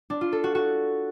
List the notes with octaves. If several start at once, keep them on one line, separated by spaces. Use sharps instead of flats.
D4
F4
A4
F#4
F#4